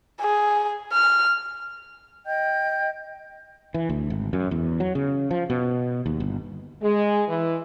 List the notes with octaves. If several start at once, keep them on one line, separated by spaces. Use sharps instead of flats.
G#4
F6
D#5 G5 G6
E3
D2
G#1
F#2
E2
F#3
C#3
F3
B2
D#2
G1
G#3
E3